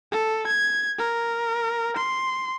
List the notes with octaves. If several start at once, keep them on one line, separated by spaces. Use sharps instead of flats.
A4
G#6
A#4
C6